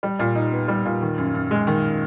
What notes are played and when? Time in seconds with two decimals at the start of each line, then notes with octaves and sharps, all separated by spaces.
0.03 G3
0.19 A#2
0.35 D#4
0.52 B3
0.68 G3
0.85 A#2
1.02 D#3
1.18 F#2
1.35 F#2
1.51 G#3
1.67 D#3